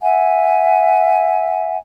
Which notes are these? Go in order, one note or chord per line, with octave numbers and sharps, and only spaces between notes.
E5 F#5 G#5